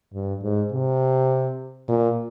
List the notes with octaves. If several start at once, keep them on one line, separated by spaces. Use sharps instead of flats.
G2
G#2
C3
A#2